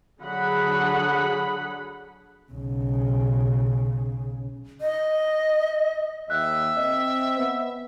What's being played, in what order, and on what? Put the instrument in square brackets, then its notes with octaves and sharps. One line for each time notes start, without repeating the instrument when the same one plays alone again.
[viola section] D3 F#3 G#4 F#5 B5
[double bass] B1 C#3
[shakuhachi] D#5
[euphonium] D#2 [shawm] E5 [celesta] F#6
[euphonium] C4 [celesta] D#5
[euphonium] B3